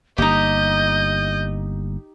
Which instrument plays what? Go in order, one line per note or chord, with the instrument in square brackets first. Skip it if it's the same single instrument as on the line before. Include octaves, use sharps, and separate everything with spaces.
[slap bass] G1 A#3 [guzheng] D#4 G4 [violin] D#5 [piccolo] G6